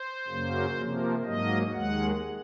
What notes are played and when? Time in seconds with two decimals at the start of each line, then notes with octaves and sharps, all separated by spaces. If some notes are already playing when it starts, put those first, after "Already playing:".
Already playing: C5
0.27 F#2 C#3 F#3 A#3
0.76 C3 F3 A#3
1.24 G#2 F#3 A#3 D#5
1.72 D#2 D#3 G#3 F#5